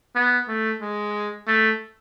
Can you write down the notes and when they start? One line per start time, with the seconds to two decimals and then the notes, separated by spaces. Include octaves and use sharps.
0.16 B3
0.48 A3
0.82 G#3
1.48 A3